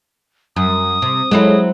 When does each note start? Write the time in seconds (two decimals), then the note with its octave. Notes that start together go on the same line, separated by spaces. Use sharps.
0.56 F#2 D#6
1.02 C3
1.31 F#3 G#3 C4 E4 A4 C5 C#5